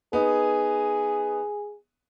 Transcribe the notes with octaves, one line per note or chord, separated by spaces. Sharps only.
B3 D#4 G#4